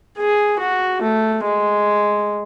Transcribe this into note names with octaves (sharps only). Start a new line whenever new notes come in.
G#4
F#4
A3
G#3